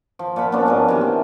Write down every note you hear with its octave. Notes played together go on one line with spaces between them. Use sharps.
F3
A#2 F3 F#5 B5
F3 B3 C#4 D4
G#2 B2 A#4
C3 E3
C4